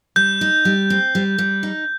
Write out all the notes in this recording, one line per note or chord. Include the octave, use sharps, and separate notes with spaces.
G3 G6
D#4
G3
C4
G3
G3
D#4